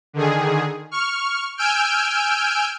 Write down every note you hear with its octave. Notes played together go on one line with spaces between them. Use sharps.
D3 D#3 G#4
C#6 F6
G#5 E6 F6 G6 D7